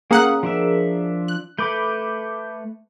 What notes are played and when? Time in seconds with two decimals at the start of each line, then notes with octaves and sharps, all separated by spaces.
0.11 A#3 C#4 G#4 A#4 F5 F#5 D#6 F#6
0.43 F3 D4 E5
1.28 F#6
1.58 A3 B4 B5 D6 G6